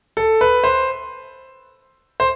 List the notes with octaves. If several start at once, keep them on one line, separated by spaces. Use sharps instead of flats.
A4
B4
C5
C5